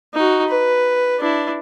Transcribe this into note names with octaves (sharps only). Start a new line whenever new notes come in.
D#4 F#4
B4
D4 E4